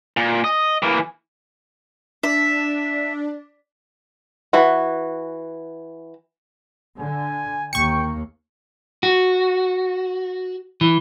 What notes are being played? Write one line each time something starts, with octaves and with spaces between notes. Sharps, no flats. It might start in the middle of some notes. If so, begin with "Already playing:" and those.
A#2
D#5
E3 A#3
D4 E5
E3 F#4
D3 G#5
D#2 A#3 G5 C#6 C#7
F#4
E3